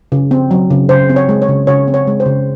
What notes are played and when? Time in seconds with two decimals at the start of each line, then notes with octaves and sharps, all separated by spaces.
0.12 C#3
0.31 C4
0.51 F#3
0.70 C#3
0.89 C#3 C5
1.09 C4
1.16 C#5
1.29 G#3
1.42 C#5
1.48 C#3
1.67 C#3 C#5
1.88 C4
1.94 C#5
2.07 G#3
2.20 C5
2.26 C#3